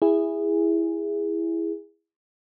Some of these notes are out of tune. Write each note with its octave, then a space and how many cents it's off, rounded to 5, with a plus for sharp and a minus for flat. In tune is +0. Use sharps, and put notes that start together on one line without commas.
E4 +5 G#4 -15